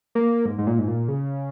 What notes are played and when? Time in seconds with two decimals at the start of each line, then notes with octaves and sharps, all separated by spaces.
0.15 A#3
0.46 G#2
0.58 G#2
0.67 A#2
0.79 G#2
0.88 A#2
1.08 C#3